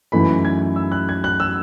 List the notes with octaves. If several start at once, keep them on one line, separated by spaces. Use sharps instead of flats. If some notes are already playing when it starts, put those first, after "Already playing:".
F#2 E3 A3 D#4 B5
G#6
E6
F#6
G#6
F#6
E6